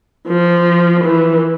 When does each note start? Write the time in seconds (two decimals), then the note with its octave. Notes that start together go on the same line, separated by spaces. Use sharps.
0.28 F3
1.04 E3